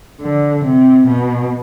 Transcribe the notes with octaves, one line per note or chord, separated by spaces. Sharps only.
D3
C3
B2